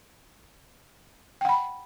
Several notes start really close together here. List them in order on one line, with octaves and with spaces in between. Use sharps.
G5 F#5 B5